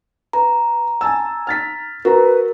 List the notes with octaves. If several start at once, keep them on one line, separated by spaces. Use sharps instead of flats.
B4 A#5
G#5 A5 E6
F6 A6 B6
F#4 A#4 B4 A#5